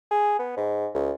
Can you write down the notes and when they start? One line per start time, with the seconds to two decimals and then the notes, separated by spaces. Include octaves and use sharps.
0.11 G#4
0.39 B3
0.57 G#2
0.94 C#2